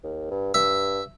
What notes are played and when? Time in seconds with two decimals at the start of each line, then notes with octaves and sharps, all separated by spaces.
0.04 D#2
0.31 G2
0.54 G2 E5